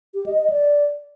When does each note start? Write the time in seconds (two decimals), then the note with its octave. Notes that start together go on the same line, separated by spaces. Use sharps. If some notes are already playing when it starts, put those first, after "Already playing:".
0.14 G4
0.26 D#5
0.38 D#5
0.50 D5